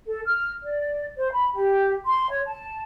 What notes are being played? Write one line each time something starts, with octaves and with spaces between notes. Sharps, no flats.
A4
F6
D5
C5
B5
G4
C6
C#5
A5